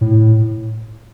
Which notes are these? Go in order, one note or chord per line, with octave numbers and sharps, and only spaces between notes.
A2